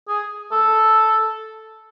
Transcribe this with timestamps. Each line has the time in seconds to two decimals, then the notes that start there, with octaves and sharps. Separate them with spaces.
0.08 G#4
0.51 A4